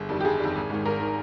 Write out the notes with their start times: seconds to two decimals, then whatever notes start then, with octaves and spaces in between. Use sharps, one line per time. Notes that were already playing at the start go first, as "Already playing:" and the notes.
Already playing: G1 G#4
0.09 F2 D#3 G3
0.20 G4
0.24 G1 G#4
0.40 F2 D#3 G3
0.55 G#1
0.70 G#2 D#3
0.85 G#1 A#4
1.00 D#3